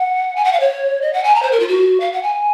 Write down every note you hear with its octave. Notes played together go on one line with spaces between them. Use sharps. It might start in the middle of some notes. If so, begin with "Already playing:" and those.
Already playing: F#5
G#5
F#5
F5
C#5
D#5
F#5
G#5
A#5
C5
A#4
F4
F#4
F5
F#5
G#5